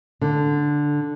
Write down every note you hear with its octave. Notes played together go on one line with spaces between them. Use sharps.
D3